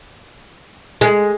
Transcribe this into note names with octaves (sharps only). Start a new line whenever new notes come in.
G#3